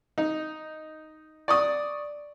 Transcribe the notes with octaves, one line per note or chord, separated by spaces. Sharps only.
D#4
D5 C#6 D#6